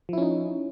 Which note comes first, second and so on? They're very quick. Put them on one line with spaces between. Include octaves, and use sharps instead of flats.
F3 E4 C#4 D#4